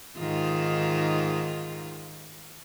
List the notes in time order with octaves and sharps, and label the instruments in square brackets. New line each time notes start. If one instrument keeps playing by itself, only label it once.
[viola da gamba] G#2 D#3 F4